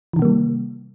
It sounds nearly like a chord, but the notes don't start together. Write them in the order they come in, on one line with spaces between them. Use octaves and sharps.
E3 D#3 C3 A#3 G3